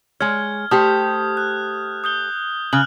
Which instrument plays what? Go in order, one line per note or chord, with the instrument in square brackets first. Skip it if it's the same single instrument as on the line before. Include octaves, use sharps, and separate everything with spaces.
[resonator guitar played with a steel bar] G#3 C#5 [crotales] F6 G#6
[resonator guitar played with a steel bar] A3 G4 C5 [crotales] D#6 G6
[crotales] F#6
D#6 G6 G7
[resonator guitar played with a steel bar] C#3 [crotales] F6 F#6 F#7